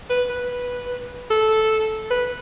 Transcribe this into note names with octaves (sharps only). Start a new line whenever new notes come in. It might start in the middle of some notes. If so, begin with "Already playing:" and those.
B4
B4
A4
B4